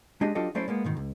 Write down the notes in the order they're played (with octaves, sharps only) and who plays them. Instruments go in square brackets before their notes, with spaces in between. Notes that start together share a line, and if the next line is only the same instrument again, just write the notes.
[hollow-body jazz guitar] G#3 D4 G4 D#5
F#3 D4 F4 G4 A4 D#5
F#3 A3 C#4 E4 C5 D5
G#3 A#3 B3
G#2 B2 D#3
C#2